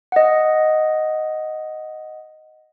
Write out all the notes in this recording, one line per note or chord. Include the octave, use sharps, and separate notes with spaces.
D#5 F#5